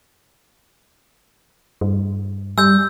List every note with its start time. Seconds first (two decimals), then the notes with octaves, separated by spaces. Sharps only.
1.81 G2
2.58 G3 E6 G6